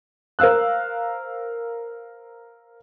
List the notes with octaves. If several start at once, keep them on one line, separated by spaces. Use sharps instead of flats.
A#4 C5 F5 E6 F#6